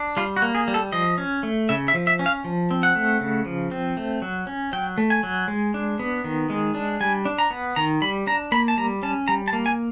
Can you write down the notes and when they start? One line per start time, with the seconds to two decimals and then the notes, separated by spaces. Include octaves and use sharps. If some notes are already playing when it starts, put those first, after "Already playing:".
Already playing: D4
0.17 G3 F4
0.36 F#4
0.42 A#3
0.55 G#4
0.68 G3
0.74 A4
0.92 F3 D#5
1.18 C#4
1.43 A3
1.69 C#3 E5
1.88 E5
1.95 F3
2.07 E5
2.19 C#4
2.26 F5
2.44 F3
2.71 C4
2.83 F#5
2.95 A3
3.20 C#3
3.46 F3
3.71 C4
3.97 A3
4.22 F#3
4.47 C#4
4.73 F#3 G5
4.98 A3
5.10 G#5
5.23 F#3
5.48 G#3
5.74 D4
5.99 B3
6.24 D#3
6.50 G#3
6.75 D4
7.00 G3 G#5
7.25 D4
7.39 A#5
7.50 B3
7.76 D#3 A#5
8.02 G3 B5
8.27 D4 A#5
8.52 A#3 B5
8.68 A5
8.77 G3 A#5
9.03 C#4 A5
9.28 G3 A#5
9.48 A5
9.53 A#3
9.66 G#5